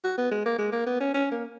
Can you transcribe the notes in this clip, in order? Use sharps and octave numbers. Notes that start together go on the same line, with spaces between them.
F#4
B3
G#3
A#3
G#3
A#3
B3
C#4
C#4
A#3